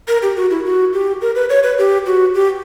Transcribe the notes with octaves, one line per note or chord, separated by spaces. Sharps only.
A#4
G4
F#4
E4
F#4
G4
A#4
B4
C#5
B4
G4
F#4
G4